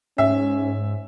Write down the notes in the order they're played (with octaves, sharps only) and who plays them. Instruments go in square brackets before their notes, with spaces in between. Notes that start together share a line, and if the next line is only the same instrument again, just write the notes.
[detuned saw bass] G#2 [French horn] C#4 [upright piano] E5